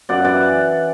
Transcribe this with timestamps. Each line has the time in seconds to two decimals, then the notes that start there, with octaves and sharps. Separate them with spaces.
0.09 F#2 D5 F#5
0.24 E3 D5 F#5